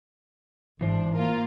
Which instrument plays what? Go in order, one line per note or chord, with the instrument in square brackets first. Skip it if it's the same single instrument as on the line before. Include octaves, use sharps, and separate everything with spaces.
[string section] G#1 D4 [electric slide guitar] E3 C5
[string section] A#3 F4 A#4